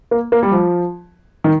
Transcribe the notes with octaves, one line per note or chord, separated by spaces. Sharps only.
A#3
A#3
G3
F3
D#3